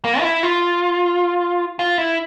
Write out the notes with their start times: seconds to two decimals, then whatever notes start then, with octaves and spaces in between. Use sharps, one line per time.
0.05 A#3
0.20 F4
0.24 E4
0.43 F4
1.79 F4
1.98 E4